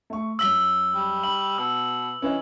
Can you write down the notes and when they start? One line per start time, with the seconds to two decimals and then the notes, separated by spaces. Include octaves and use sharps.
0.10 A3 C#6
0.39 F#2 E6 B6 F#7 G7
0.95 G3
1.23 B5 F#7
1.58 B2 E6
2.22 E3 C#4 B4 D#5